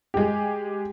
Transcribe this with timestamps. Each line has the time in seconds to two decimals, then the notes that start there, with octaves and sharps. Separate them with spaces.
0.14 G#3 G4